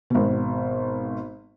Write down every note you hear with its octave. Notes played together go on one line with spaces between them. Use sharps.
G#1 B2